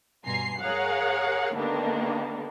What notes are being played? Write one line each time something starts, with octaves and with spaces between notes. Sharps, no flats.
G2 B2 G#5 A#5 C6 C7
G#4 A#4 C#5 F5 F#5
D3 D#3 G3 A#3 B3 D4